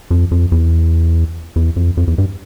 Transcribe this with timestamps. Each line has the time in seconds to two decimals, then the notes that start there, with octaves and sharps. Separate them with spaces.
0.11 F2
0.31 F2
0.52 E2
1.56 E2
1.76 F2
1.97 F2
2.08 E2
2.18 G2